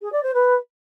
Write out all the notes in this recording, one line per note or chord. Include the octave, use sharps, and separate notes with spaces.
G#4
D5
C5
B4